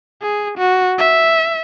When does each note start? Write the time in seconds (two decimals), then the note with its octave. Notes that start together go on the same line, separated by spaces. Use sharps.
0.22 G#4
0.58 F#4
0.98 E5